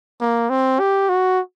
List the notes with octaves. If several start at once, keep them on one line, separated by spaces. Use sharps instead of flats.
A#3
C4
G4
F#4